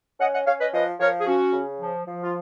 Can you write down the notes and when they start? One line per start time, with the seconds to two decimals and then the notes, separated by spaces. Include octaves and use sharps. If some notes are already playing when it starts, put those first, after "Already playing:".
0.20 C#4 D#5 F#5
0.33 D#5 F#5
0.46 C#4 C#5 F5
0.61 B4 D#5
0.73 F3 B4 D#5
1.00 F3 A#4 C#5
1.20 G#4
1.26 C#4 F#4
1.53 C#3
1.79 F3
2.06 F3
2.23 F4